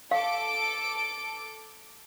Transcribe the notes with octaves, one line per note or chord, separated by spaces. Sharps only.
A4 F5 D6 D7